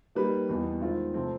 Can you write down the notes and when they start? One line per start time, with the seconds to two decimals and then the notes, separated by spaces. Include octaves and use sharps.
0.15 G3 A#3 D#4 G4 B4
0.49 E2 B2 G3 B3
0.81 D#3 G#3 C4 F4
1.14 C3 F3 A3 C4